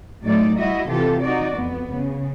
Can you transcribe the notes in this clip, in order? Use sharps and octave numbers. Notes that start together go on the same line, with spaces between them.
A2 F#3 A3 D#4 D5
G3 E4 F#4 D#5 E5
C3 E3 F4 G4 A4
D#4 F#4 D5
F2 B3
C#3